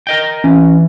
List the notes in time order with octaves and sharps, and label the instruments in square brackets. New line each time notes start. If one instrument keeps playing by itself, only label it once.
[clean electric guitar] A#4 D#5 G5
[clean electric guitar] E3 [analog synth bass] C#4